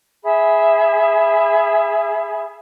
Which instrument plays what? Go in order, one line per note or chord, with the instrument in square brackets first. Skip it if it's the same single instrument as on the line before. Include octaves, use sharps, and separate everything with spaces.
[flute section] G#4 E5 B5